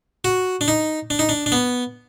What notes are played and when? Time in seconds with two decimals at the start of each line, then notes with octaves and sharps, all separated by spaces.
0.24 F#4
0.61 D4
0.68 D#4
1.10 D4
1.19 D#4
1.29 D4
1.46 D4
1.52 B3